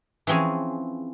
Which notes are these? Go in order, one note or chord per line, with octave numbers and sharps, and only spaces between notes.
E3 F3 C4 C#4 G#4